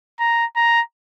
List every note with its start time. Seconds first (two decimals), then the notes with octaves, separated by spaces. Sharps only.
0.20 A#5
0.56 A#5